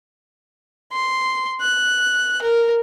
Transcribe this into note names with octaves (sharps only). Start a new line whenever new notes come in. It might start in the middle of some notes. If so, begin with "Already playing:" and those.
C6
F#6
A#4